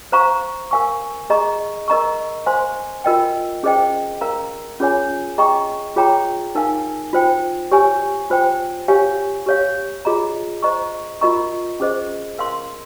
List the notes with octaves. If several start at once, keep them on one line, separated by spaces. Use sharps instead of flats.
C5 F5 A#5 C#6
A#4 F5 G#5 C#6
G#4 D#5 A#5 C#6
A#4 D#5 A#5 C#6
C5 F5 G#5 C6
F4 A#4 D#5 G5
C#4 G#4 C5 D#5 G5
A#4 F5 A#5
C#4 F4 G#4 C#5 G#5
G#4 D#5 G5 A#5 C#6
F4 G#4 C#5 G5 A#5
D#4 A#4 F5 G#5
F4 C5 G5
G4 C#5 G#5
F4 C5 G5
G4 C#5 F5 G#5
G4 C#5 F5
F4 G#4 D#5 A#5
C5 D#5 A#5 C#6
F4 A#4 D#5 A#5 C#6
C#4 G#4 C5 D#5
A#4 F5 C6